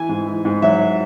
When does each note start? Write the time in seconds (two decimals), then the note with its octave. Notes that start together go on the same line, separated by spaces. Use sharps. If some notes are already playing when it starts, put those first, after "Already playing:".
Already playing: E3 G#5
0.09 G#2
0.27 E3
0.45 G#2
0.62 F#3 E5